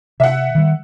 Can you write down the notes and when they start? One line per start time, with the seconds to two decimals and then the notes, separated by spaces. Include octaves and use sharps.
0.20 C3 E5 F#5
0.55 D#3 G3